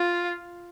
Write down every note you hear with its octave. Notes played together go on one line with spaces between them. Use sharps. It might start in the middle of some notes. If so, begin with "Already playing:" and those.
Already playing: F4